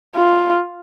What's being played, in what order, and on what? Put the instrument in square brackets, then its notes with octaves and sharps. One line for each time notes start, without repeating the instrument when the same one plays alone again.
[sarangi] F4